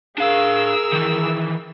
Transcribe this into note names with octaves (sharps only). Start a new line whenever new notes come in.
D4 G#4 A#4 F5 E6
D#3 E3